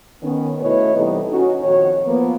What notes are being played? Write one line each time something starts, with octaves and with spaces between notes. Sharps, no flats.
D#3 B3 C#4
B2 A3 E4 B4 C#5 D#5
C3 E3 G3 B3 D#4 A4
C#4 D#4 F#4
F2 A#2 D#3 F#4 C#5
F3 A#3 B3